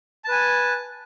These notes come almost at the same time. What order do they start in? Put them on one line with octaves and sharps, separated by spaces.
A5 B4 G#5